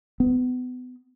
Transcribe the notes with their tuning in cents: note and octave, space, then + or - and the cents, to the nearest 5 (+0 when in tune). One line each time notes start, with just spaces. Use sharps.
B3 +30